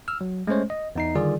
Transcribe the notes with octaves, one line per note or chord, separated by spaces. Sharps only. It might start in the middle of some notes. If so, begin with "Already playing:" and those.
E6 F6
F#3
G#3 A3 C#4 C5 C#5
D#5
E2 D#4 C7
D3 D#3 G3 F4 G#4 D5